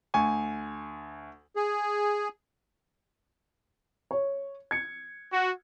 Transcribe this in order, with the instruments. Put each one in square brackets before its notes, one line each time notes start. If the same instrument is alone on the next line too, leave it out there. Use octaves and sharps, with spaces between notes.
[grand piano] D2 G#5 C#6
[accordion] G#4
[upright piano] C#5
G#6 C#7
[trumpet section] F#4